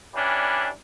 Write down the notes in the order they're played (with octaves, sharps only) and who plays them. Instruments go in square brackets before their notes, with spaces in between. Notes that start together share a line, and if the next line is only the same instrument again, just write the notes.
[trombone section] E3 G3 C#4 D4